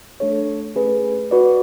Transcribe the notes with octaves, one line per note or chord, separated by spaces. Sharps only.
A3 D4 A4 C#5
A3 C#4 G#4 B4
F#4 B4 D5